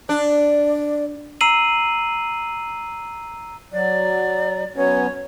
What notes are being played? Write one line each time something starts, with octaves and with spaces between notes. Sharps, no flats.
D4 D5
A#5 E6 C7 D#7 F#7
F#3 D5
F#3 B3 C#4 C#5